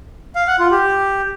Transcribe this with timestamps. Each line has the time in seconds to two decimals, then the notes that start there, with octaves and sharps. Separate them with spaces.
0.35 F5
0.47 F#5
0.59 F4
0.71 G4